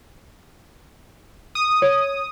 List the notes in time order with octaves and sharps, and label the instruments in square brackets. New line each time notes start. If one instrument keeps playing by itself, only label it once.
[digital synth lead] D#6
[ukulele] C#5